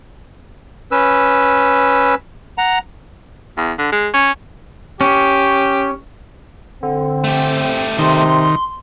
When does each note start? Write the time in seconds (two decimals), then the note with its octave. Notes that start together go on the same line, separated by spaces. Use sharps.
0.92 C#4 B4 E6
2.58 F#5 A#5
3.57 E2
3.79 D3
3.92 G#3
4.14 C#4
5.01 C#4 G4
6.83 D3 C4
7.24 A3 G4
7.99 C3 D#3 C6